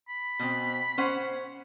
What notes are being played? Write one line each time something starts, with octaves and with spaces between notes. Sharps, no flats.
B5
B2 C4
C#4 C5 F#5